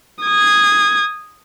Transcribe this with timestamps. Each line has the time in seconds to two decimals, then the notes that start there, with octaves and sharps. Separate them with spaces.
0.23 D#6 G#6